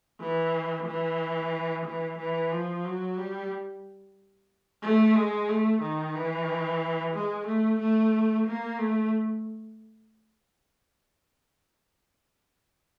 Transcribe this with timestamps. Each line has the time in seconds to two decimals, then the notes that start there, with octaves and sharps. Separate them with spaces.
0.20 E3
0.86 E3
1.85 E3
2.19 E3
2.52 F3
2.85 F#3
3.17 G3
4.83 A3
5.15 G#3
5.48 A3
5.82 D#3
6.15 E3
7.14 G#3
7.47 A3
7.80 A3
8.46 A#3
8.79 A3